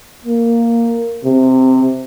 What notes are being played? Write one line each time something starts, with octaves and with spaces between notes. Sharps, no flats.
A#3
C3